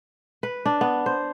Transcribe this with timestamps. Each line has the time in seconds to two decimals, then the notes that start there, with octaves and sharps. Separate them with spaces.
0.43 B4
0.66 D4
0.81 B3
1.06 C5